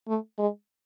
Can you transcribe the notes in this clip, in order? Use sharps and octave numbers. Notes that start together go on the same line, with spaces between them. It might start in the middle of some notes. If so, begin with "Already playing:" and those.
A3
G#3